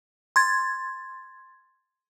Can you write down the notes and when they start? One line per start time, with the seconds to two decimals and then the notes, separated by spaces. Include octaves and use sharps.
0.36 C6 G#6 A6